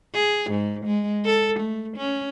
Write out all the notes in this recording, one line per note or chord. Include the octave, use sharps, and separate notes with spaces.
G#4
G#2
G#3
A4
A3
C#4